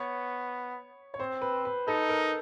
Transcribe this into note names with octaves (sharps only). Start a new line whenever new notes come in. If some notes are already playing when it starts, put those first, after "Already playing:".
Already playing: B3 C#5
C#5
C4 C5
B4
B4
D#4 A4
A#4